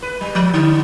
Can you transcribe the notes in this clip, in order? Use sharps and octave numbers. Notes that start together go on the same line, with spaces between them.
B4
G3
F3
D3